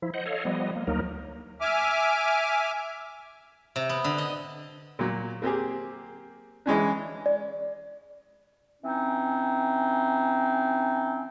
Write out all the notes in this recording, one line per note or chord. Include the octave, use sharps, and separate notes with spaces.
F3 E4
C5 D#5 F#5
A4 C#5 D#5 F5
F3 G3 B3 D#5
A#3
D2 F#3 A#3 D#4 A#4
E5 G#5 D6 F6
C3
B3
D3
D#5
A#2 F#3
A#3 C4 G4 G#4
E3 G#3 C#4 D4
D5
E3 C4 C#4 D#4